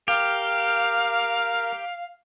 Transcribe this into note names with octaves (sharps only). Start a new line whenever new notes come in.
G4 A#4 F5